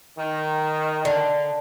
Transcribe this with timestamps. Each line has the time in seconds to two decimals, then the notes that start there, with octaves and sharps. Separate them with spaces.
0.19 D#3
1.05 D3